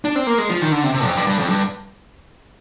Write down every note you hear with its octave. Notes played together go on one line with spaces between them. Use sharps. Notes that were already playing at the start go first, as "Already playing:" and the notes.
D4
C4
A#3
G#3
F3
D#3
D3
C3
C3
F2
G2
G2
F2
G2